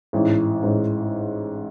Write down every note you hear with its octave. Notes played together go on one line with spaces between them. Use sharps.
A1 G#2 E3
A1 G#2 E3